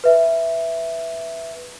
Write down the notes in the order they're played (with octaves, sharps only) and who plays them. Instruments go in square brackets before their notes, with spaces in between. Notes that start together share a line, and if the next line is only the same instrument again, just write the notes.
[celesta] B4 E5